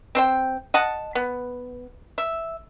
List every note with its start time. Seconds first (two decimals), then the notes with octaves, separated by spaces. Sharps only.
0.15 C4 C5 G5
0.74 D#5 F#5 A5
1.15 B3
2.18 E5